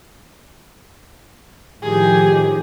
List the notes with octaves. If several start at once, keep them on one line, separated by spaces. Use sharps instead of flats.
A2 D#3 F3 G4 G#4